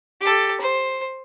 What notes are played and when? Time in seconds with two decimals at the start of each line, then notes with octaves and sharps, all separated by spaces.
0.21 G4 A4
0.60 C5